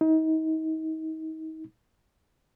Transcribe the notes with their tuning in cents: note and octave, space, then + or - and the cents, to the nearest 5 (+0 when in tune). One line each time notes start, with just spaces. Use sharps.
D#4 +35